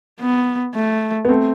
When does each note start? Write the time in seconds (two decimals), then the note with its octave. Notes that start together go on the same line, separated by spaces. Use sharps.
0.20 B3
0.75 A3
1.25 B3
1.29 A3 C4